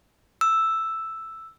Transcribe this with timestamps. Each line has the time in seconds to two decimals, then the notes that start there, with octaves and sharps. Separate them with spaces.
0.41 E6